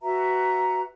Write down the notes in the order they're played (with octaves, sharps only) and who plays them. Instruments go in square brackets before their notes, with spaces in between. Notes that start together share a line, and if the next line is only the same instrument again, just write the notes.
[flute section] F#4 B4 E5 A#5